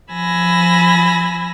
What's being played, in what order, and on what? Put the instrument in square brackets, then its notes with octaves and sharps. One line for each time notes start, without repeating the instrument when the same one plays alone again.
[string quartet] F3 G#5 B5 E6 A#6